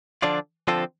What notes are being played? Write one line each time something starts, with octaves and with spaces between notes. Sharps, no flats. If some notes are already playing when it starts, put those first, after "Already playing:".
D3 F3 D4 F4 D5
D3 F3 C4 F4 A4